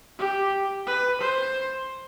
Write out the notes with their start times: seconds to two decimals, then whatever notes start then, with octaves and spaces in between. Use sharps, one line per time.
0.19 G4
0.87 B4
1.21 C5